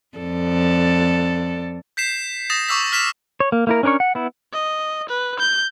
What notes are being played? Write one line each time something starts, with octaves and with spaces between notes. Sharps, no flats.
F2 A4 D5
G6 B6 C7 E7
D#6 A6 A#6 E7
C#6 D6 E6 B6
F6 B6 E7
C#5
A#3
A#3 E4 A#4
C#4 D4 A#4 C#5 C#6
F#5
B3 E4
D#5
B4
G6